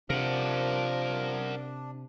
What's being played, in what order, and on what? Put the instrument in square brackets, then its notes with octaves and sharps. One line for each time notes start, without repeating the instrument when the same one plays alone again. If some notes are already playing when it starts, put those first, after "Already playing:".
[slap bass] C3 [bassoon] F3 [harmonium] D4 [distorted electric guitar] A#4 F#5